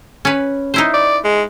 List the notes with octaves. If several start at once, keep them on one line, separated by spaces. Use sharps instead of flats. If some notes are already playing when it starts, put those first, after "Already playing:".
C#4 B4
D#4 E4 C5
D5
G#3